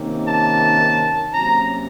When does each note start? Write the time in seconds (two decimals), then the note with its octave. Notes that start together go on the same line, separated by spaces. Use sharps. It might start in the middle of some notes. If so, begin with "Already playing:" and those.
Already playing: C3 D#3 A#3 C#4
0.27 A5
1.34 C3 F#3 A#3 C#4 A#5